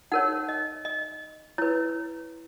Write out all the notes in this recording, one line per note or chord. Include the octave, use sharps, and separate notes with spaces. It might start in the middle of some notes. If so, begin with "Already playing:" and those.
D#4 A#4 C#5 F#5
D#5
D#5
E4 B4 C#5